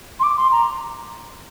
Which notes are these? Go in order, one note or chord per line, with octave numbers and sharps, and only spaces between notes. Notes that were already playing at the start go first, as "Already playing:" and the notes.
C6
D6
C6
A#5